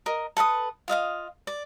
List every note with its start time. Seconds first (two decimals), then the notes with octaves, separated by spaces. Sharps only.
0.06 A#4 D#5
0.37 A4 B4 A#5 D#6
0.88 F4 D#5 F5 D#6
1.47 D5